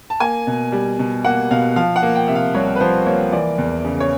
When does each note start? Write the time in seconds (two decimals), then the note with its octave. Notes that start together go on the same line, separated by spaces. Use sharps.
0.10 A5
0.20 A#3 G#5
0.47 B2
0.72 G3
0.99 B2
1.25 A#3 F#5
1.51 B2 F5
1.76 F3 F5
1.96 F#5
2.03 A#3
2.15 G5
2.28 C3 E5
2.35 F5
2.54 C2 C#5
2.76 B4
2.80 F3 C5
3.06 A#3 C#5
3.32 E3 D5
3.58 E2
3.85 C#3
4.00 C#5